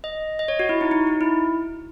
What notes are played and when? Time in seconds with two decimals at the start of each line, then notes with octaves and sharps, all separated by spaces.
0.04 D#5
0.39 D#5
0.48 C#5
0.59 F#4
0.69 E4
0.81 D#4
0.91 D#4
1.07 D#4
1.21 E4